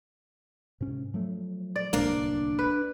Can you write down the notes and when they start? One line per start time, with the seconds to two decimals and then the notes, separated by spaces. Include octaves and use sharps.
0.81 G#2 C3 C#4
1.14 F3 F#3 A3
1.76 D5
1.93 D1 C2 A#3 D4 D5
2.59 B4